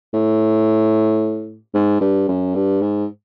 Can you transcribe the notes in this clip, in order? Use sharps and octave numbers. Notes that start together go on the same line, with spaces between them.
A2
G#2
G2
F#2
G2
G#2